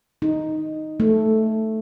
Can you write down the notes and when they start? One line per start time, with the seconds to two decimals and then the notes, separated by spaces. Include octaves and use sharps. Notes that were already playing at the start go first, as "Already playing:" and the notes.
0.22 D#4
1.00 A3